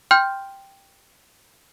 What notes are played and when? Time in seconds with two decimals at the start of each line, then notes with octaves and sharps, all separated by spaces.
0.11 G5 C6 F6 G6